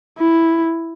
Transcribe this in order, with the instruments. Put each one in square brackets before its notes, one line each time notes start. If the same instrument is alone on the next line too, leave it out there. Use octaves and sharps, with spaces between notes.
[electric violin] E4